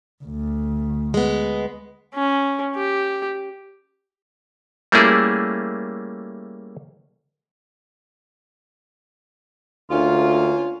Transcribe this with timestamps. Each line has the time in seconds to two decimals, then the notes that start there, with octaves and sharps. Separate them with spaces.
0.24 D2
1.14 G#3 B3
2.14 C#4
2.75 G4
4.92 G3 A3 A#3 C#4 E4 G#4
9.91 D2 A#3 C#4 F4